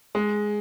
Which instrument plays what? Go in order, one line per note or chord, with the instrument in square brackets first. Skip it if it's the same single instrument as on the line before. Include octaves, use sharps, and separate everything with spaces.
[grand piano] G#3